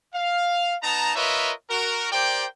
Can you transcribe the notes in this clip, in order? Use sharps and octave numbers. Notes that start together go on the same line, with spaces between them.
F5
B3 D#4 A5 A#5
F4 A#4 B4 C#5 D#5 E5
F#4 A#4
G4 A#4 C5 D5 G5